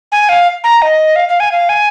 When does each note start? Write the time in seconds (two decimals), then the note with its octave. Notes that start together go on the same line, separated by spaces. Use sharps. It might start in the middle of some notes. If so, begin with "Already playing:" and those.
0.12 G#5
0.29 F5
0.64 A#5
0.82 D#5
1.16 F5
1.29 F5
1.40 G#5
1.52 F5
1.69 G#5